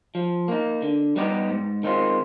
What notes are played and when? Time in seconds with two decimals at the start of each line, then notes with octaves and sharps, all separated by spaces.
0.15 F3
0.48 A#3 D#4
0.82 D3
1.16 G3 B3 D#4 G4
1.50 G#2
1.83 D#3 G#3 C4 F4